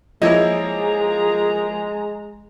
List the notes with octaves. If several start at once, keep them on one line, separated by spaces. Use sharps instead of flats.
F3 G#3 A#3 E4 G#4 C#5 D#5 A#5